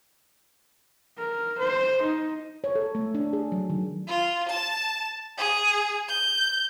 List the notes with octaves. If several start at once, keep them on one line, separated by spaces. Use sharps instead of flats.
A#4
C5
D#4
C#5
A4
A3
D4
G#4
F#3
D#3
F4
A5
G#4
G6